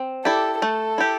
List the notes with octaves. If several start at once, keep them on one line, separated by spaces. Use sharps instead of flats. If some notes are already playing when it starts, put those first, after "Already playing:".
Already playing: C4
E4 G4 A4 D5
A3 A4
E4 G4